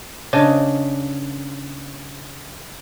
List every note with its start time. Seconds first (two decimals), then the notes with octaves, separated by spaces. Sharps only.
0.33 C#3 D4 D#5